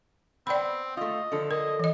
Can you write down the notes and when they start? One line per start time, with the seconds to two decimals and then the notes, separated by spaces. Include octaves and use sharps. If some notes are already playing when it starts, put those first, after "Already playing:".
0.47 B3 C4 D5 G5 B5
0.97 A3 F4 D#5
1.32 D3 F3 A4
1.51 A#4 D#5
1.79 E3 D#5